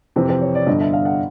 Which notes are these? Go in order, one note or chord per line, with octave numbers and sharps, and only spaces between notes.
F2 C3 E3 C5
C5
C#5
D5
G1 G2 D3 D#5
E5
F5
F#5